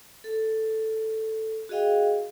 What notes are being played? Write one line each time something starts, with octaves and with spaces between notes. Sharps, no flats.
A4
F#4 G#4 D#5 F5 G5